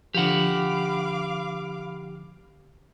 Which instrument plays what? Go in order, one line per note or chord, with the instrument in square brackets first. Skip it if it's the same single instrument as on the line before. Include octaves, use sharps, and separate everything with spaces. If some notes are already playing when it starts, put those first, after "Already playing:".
[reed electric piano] D3 F3 [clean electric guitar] G4 F#5 [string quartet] F5 B5 D6